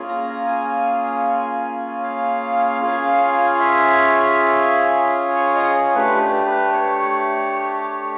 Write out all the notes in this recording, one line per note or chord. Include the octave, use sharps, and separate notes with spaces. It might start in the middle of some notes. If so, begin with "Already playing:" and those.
Already playing: A#3 C#4 F4 G#4
A#5
G#5
F5
C#4 F4 G#4
E5
C#5
D#5
C#5
A3 D4 G4 B4
B4
C#5